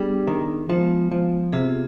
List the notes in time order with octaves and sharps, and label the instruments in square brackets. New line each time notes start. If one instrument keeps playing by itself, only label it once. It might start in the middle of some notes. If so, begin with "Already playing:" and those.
Already playing: [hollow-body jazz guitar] G3 [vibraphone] B3 D4 G#4
[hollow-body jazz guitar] D#3
[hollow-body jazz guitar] F3 [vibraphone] G#3 B3 F4
[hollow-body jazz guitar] F3
[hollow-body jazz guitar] C3 [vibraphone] B3 F4 G#4